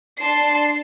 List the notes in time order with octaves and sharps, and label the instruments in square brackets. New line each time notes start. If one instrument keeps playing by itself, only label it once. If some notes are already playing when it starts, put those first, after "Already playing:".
[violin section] D4 C7 [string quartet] A5 C6